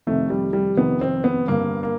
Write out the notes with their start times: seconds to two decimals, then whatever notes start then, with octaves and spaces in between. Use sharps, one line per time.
0.07 F2 C3 D#3 A3
0.30 G3
0.53 G3
0.77 F2 C3 D#3 B3
1.01 C4
1.24 B3
1.48 G2 D3 A#3
1.83 A#3